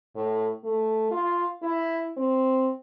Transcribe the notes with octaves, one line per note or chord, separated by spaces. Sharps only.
A2
A3
F4
E4
C4